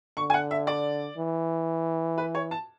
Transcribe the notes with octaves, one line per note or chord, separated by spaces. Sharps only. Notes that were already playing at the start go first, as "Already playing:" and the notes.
D3 C#6
G#5
F#5
E5
D5
E3
B4
C#5
A5